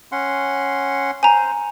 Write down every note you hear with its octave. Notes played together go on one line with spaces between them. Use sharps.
C#4 F#5 C6
C5 G#5 A#5